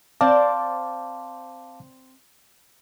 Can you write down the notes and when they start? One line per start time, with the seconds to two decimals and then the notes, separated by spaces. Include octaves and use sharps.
0.21 C4 C5 D5 F5 A5 D6